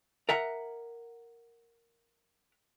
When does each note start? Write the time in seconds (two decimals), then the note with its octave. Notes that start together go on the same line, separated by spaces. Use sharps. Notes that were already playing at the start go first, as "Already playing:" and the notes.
0.29 A#4 E5 F#5 A#5